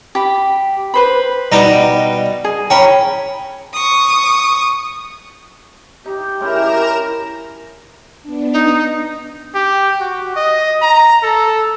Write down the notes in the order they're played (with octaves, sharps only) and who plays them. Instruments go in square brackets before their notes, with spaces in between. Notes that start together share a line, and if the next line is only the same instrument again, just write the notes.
[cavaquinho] G4 B5
B4 C5 B5
[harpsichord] B2 G3 D#4
[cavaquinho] G#4
[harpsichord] C#4 [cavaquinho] G5 A#5 B5
[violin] C#6 D#6
[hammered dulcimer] D#4 [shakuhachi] G4
[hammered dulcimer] G#3 C#4 E4 [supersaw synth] A#4 A#5 E7
[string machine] B3 D4
[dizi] D#4
[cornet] G4
F#4
D#5
A#5
A4